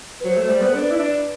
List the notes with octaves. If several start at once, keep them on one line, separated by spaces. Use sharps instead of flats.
B4
F#3 C5
A3 C5
G3
B3 C5
A4
D4 B4
E4
D4